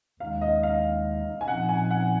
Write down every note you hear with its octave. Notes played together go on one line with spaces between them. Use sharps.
D#2 D#3 G#3 D#4 F5
D#5
F5
G#5
A#2 F3 C4 D#4 F#5
G#5
F#5